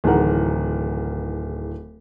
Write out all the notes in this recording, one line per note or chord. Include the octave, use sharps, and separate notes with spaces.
D1 D#3 E3 G#4 A#4 F#5